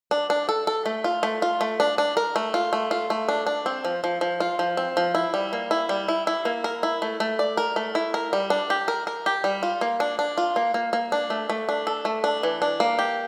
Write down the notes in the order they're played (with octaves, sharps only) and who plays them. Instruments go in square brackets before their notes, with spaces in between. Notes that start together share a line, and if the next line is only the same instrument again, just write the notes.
[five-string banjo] D4
D4
A4
A4
A3
F4
A3
F4
A3
D4
D4
A#4
A3
F4
A3
F4
A3
D4
D4
C4
F3
F3
F3
F4
F3
C4
F3
E4
G3
A#3
E4
G3
E4
E4
A#3
A#4
E4
A3
A3
D5
A#4
A3
E4
A#4
G3
D4
G4
A#4
A#4
G4
G3
F4
A#3
D4
D4
F4
A#3
A#3
A#3
D4
A3
A3
D4
A4
A3
D4
E3
D4
A#3
G4